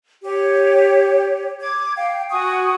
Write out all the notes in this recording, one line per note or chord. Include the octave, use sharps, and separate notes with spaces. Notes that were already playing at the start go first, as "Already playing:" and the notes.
G4 C#5
D6 G#6
F5 G5
F#4 G#5 C#6 D#6